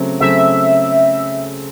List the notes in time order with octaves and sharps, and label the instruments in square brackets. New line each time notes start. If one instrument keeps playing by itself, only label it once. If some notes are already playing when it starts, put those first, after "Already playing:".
Already playing: [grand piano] C#3 F#3 A3 C4
[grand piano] C#3 F#3 A3 C4 [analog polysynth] E5